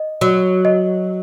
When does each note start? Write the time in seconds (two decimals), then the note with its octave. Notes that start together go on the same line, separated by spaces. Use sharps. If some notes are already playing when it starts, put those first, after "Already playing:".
Already playing: D#5
0.21 F#3 F#4
0.65 D#5